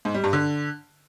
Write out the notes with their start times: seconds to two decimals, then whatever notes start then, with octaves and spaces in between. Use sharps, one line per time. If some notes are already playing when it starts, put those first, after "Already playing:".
0.05 G#2
0.14 G3
0.24 G2
0.33 D3